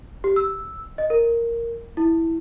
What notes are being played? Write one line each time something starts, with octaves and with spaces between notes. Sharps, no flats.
G4
E6
D#5
A#4
E4